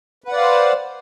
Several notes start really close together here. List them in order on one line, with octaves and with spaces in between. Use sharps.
B4 F#5 D5 F5 C5